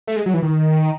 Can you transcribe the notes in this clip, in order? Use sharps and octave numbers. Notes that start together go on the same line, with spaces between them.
A3
G#3
F#3
E3
D#3